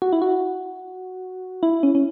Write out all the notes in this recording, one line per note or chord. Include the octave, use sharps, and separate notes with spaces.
F#4
E4
F#4
E4
C#4
C#4